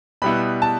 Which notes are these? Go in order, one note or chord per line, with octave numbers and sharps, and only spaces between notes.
B2 G3 B3 E4 B5
A5